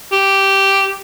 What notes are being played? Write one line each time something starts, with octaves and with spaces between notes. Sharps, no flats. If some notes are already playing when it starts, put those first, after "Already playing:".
G4